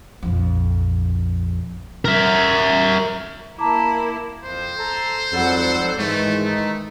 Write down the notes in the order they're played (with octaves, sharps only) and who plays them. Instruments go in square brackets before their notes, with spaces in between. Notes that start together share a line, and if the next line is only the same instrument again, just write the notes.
[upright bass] A#1 F2
[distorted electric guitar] A#4 E5
[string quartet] A#3 E4 [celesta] A5 A#5 D6
[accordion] F2 [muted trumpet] C5
[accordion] A4 A#5
[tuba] F2 [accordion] G#2 F#3 G3 [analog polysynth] A4 F#5
[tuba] G#2 [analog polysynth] D#3 E3 G#3 [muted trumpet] A3 [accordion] C#5
[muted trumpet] A3 [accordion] D#4